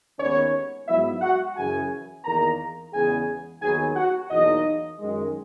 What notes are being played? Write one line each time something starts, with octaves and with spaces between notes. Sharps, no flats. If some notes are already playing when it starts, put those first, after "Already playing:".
D#2 D#3 G#3 B3 C#4 C#5
G#2 F#3 B3 E4 E5
F#4 F#5
F#2 C#3 E3 G#4 G#5
E2 D#3 A#3 A#4 A#5
E2 C#3 G#3 B3 G#4 G#5
D#2 D#3 F#3 B3 G#4 G#5
F#4 F#5
E2 B2 F#3 A#3 D#4 D#5
F#2 D#3 G#3